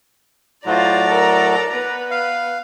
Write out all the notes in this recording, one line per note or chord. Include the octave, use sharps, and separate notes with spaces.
A2 F#3 F4 C5 D5 A#5
A4 A#4
B3 B4
F5